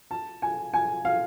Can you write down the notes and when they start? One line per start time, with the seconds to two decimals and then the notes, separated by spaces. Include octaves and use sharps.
0.11 A5
0.42 G#5
0.74 G#5
1.05 F5